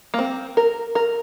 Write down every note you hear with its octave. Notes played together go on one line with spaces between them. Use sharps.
A#3
C4
A#4
A#4